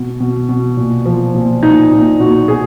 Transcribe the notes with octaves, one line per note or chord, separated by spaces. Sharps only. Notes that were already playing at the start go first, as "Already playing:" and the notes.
Already playing: B2
B2
B2
A#2
F3
A#2
A#2 D#4
A#2
A#2 F#4
B2 G#4